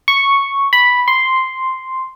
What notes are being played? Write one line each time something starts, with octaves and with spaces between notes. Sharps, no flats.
C#6
B5
C6